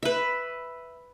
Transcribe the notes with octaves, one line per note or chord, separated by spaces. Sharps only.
B4 E5